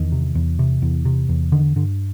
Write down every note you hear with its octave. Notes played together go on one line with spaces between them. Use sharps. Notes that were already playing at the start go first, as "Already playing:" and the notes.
Already playing: E2 D#3
C3
E2
C3
E2
C3
E2
D3 D#3
G2 D3